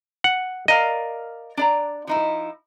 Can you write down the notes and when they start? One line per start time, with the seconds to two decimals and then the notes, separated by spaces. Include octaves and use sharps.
0.24 F#5
0.68 A#4 D5 D#5 F5
1.57 D4 D5 A#5
2.07 F3 D#4 E4